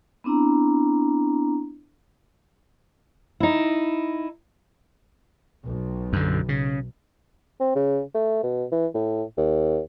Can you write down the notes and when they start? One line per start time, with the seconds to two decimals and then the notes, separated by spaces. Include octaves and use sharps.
0.24 B3 C4 D4 E4 A#5
3.40 D#4 E4
5.64 B1
6.13 F#2 D3
6.49 C#3
7.60 C4
7.75 C#3
8.14 A3
8.43 B2
8.72 E3
8.94 A2
9.37 D#2